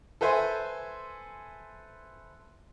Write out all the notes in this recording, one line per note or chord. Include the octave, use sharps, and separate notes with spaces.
A4 B4 C5 E5 G#5 C6